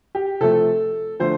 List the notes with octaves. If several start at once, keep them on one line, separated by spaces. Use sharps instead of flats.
G4
C3 F3 A3 A4
D3 F3 A3 C5